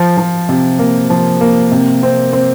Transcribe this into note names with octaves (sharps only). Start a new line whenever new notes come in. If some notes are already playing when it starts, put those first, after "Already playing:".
Already playing: F3
F3
C3
A#3
F3
A#3
C3
C4
C4